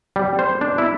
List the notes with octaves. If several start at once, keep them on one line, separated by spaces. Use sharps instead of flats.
G3
C5
D4
E4